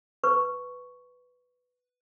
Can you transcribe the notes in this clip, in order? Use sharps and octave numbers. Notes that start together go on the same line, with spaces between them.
B4 C#6